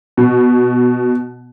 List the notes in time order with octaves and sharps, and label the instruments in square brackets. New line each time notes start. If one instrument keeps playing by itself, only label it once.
[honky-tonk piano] B2